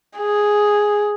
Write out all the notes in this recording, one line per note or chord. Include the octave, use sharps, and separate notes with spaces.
G#4